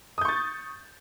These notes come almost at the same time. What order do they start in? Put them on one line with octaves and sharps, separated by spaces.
D#6 G6 C#6 A6